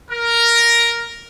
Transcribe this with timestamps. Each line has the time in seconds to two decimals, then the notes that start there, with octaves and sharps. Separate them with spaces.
0.11 A#4